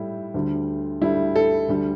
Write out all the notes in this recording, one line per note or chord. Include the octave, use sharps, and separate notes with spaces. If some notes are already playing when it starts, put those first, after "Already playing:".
Already playing: A2 G3 E4
D2 D3 G3
D2 D3 G3 E4
A4
D2 D3 G3